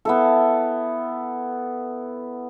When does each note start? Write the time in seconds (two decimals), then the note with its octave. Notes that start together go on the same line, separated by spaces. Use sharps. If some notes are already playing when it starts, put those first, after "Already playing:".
0.05 B3 E4 A4